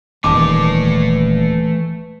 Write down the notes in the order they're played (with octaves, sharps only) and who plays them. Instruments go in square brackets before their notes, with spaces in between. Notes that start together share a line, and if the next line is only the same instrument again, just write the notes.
[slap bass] D#1 D#2 [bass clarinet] E3 [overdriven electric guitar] A3 C#5 [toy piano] A5 D6